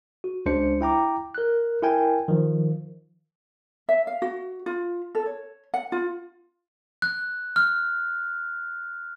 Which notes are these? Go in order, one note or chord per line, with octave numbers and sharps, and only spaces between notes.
F#4
C#2 G#3 D4 C5 C#7
E4 G5 A#5 D6
A#4 F#6
E4 A#4 G5 G#5
D#3 F3
E5
F5
F#4
F4
A4
C#5
F#5
F4
F#6
F6